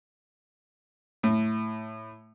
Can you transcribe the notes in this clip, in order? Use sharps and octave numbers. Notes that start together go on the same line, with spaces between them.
A2